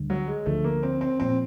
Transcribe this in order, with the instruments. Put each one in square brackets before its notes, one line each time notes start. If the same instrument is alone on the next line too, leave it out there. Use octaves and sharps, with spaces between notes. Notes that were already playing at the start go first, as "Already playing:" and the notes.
Already playing: [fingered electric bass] D2 D3 G3
[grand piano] F#3
G#3
[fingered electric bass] D2 D3 F3 [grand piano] A3
[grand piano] A#3
C4
C4
[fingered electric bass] A#2 F3 [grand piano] C4